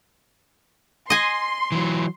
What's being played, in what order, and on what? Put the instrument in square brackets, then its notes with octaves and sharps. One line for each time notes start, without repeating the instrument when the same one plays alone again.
[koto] D#5 G#5 [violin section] C6
[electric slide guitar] E3 F#3